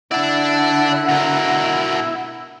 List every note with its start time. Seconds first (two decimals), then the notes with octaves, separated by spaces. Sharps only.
0.11 D3 E4 D5 F#5 A5
1.09 B2 A#4